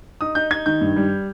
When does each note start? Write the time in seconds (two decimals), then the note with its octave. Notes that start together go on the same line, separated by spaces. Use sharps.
0.21 D#4 D#6
0.35 D#4 G6
0.50 D#4 G#6
0.66 D#3 G6
0.81 G2
0.96 G3